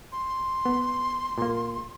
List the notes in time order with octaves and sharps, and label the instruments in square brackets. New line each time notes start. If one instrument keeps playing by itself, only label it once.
[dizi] C6
[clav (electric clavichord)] B3
A#2 A#3